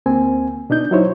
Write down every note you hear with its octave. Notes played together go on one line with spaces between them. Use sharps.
D2 A#3 C4 G#5
B2 D4 D#4 G6
F#3 D#4 E4 C5 C#5